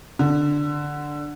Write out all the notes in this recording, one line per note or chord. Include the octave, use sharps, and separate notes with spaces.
D3